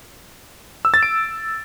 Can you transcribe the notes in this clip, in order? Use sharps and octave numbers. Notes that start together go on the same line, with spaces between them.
E6
A6
D7